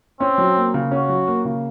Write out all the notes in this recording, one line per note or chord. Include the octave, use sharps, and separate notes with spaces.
C4 C#4
F#3
A#3
C#3
C#4 F#4
F#3
A#3
C#3